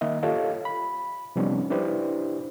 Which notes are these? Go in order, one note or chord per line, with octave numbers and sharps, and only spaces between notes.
D#3 A#3 D#5 E5
F4 G4 A4 C#5 D#5 F5
B5
C3 F3 G3 B3 C#4 D#4
D4 E4 G4 B4 C5